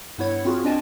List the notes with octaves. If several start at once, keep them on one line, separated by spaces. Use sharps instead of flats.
G2 B3 E4 C#5 G#6
C4 F4 F#4 G#4
C4 D4 D5 D#5 G#5 A5